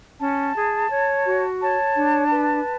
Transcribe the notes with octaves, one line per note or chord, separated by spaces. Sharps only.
C#4 A5
G#4
C#5
F#4
C#5 A5
D4
B4